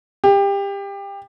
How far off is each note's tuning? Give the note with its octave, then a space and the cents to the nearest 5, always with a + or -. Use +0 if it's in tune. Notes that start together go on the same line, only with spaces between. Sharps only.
G4 +25